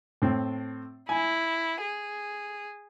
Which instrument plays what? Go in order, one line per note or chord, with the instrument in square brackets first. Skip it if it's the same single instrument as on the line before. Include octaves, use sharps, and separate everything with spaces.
[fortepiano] A2 C4
[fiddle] E4 [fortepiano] G#5
[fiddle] G#4